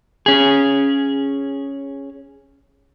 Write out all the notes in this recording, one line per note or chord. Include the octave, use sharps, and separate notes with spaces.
C#4 G#4